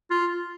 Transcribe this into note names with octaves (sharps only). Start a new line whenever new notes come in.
F4